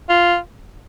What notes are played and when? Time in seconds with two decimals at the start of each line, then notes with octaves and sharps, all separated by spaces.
0.09 F4